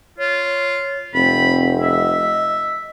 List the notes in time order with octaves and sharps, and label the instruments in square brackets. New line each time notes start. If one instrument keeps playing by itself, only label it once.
[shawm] F4 [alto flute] C#5
[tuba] F1 [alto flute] C4 [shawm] B5
[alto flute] D#5 [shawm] E5